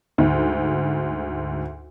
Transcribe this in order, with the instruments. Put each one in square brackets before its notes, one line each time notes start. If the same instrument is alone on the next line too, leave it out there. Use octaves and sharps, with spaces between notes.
[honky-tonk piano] D2 G#2